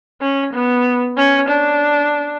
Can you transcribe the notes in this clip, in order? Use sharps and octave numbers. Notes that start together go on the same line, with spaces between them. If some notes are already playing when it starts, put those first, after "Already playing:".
C#4
B3
C#4
D4